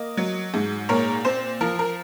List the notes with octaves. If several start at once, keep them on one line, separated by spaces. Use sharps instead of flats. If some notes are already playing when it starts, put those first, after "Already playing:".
Already playing: A#3 D#5
F#3
G#2
A#2 A#4 C#5
C4 C5
F3 A#4
A#4